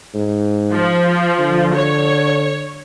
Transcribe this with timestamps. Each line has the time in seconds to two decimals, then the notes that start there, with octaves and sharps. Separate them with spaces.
0.14 G#2
0.72 F3
1.39 D3
1.74 C#5